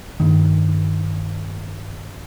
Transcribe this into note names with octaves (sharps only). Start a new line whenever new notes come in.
G2 D#3 A#3